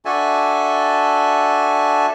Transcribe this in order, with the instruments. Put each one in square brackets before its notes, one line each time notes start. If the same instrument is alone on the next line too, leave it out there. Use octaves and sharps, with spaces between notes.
[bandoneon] D4 F#4 A4 E5 G#5 A5